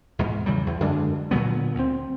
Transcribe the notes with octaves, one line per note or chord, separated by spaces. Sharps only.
E2 G#2 B2
C#3 E3 F#3 G3
E2
F#2 D3 G#3 D4
A#2 D3 F#3 B3
D2 C4